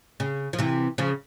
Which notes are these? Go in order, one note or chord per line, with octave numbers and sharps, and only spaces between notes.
C#3
F3
C3 E3
C#3 F3